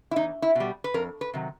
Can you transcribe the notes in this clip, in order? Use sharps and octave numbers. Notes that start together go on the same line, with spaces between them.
E4
E2 D#4
E4
B2 G3
B4
F2 A#4
B4
C3 D#3 F#3